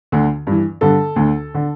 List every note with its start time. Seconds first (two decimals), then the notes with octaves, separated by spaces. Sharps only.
0.12 D2 D3
0.47 G2 E3
0.81 G2 D3 A4
1.16 D2 D3
1.54 D3